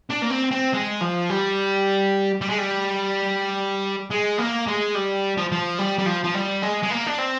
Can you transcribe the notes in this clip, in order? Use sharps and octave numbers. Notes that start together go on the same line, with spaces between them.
D4
A#3
C4
C4
G#3
F3
G3
G3
G#3
G3
G#3
A#3
G#3
G3
F3
F3
G3
G3
F3
F3
G3
G#3
G#3
A#3
D4
C4